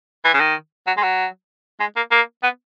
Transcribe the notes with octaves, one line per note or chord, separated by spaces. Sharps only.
E3
C#3
D#3
F#3
G#3
F#3
G#3
A#3
A#3
B3